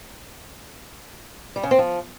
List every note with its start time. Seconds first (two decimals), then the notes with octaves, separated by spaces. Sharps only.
1.56 G3
1.63 C#3
1.71 C4
1.79 F3